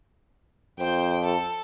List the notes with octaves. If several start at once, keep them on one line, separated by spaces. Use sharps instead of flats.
F2 C5 G5
A4